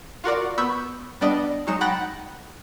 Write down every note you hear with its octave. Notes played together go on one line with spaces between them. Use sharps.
F4 F#4 A#4 D5
B3 B5 C#6 E6 G6
G3 B3 D4 D5 D#5
F#3 G#3 D#4 C#7 E7
F#5 G5 B5 F#6 A6 A#6